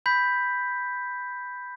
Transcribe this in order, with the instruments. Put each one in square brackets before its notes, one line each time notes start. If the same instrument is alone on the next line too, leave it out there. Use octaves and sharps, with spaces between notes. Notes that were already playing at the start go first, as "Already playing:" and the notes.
[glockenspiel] B5 G6 B6